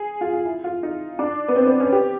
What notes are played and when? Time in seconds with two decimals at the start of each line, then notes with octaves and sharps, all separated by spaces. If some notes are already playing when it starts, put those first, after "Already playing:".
Already playing: G#4
0.21 F4
0.33 F4
0.45 E4
0.64 F4
0.83 D#4
1.19 D4
1.48 B3
1.56 C4
1.67 C4
1.80 C#4
1.92 G4